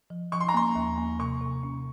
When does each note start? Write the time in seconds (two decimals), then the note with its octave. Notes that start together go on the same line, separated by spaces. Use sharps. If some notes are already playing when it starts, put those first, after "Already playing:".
0.10 F3
0.32 F3 C#6
0.40 C6
0.48 A#5
0.54 A#3 C6
0.75 D#2
0.98 A#3
1.19 C3 C#6
1.41 C3
1.63 C#4